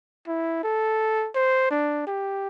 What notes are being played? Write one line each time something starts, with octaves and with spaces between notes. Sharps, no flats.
E4
A4
C5
D4
G4